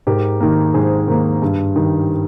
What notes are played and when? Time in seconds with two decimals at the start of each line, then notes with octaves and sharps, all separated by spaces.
0.07 G#2 G4 A#4
0.41 D#3 A#3
0.74 G#2 G#4 C5
1.08 D#3 A#3
1.42 G2
1.76 D#3 G3